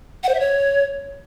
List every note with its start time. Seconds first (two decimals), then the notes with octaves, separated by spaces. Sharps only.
0.23 F#5
0.29 C5
0.34 E5
0.40 C#5